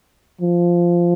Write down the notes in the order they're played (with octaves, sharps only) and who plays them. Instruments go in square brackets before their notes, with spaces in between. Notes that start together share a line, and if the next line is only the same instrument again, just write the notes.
[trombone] F3